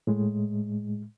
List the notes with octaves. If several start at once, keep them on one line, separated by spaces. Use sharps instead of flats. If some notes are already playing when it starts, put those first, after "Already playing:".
A2 G#3